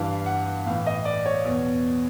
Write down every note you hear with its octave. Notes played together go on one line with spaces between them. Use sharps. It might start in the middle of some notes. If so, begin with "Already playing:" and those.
Already playing: G2 E3 F5
F#5
A2 E3 F5
D#5
D5
C#5
E2
B2